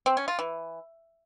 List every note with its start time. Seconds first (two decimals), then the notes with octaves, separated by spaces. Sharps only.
0.06 C4
0.17 C#4
0.28 F4
0.39 E3